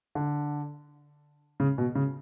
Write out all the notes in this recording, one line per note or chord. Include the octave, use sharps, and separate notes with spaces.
D3
C#3
B2
C#3